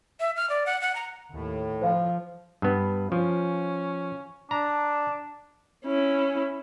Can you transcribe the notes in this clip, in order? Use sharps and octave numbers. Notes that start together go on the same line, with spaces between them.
E5
F6
D5
F#5
F#5
A#5
D#2 A2
F3 C5 F5
G2 B3
F3 C#4
D4 A#5
C#4 E4